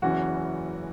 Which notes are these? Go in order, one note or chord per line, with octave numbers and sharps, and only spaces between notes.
F#1 E2 E3 C#4 F#4